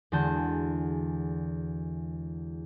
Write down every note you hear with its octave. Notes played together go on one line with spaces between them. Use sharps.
E2 D3 G#3 F#4 A5 G6